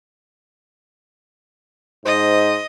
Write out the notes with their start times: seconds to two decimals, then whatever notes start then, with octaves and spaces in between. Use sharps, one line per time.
2.05 G#2 C5 D#5